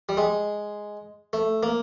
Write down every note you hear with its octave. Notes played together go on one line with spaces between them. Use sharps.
G3
G#3
A3
A#3